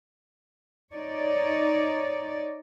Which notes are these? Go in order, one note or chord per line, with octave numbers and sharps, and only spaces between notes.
D#4 C#5 D5